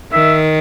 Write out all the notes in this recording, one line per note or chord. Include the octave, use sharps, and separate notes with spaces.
D#3 E5